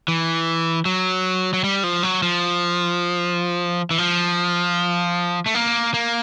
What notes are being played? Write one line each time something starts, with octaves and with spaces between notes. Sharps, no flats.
E3
F#3
F#3
G3
F3
F#3
F3
E3
F3
A3
A#3
A#3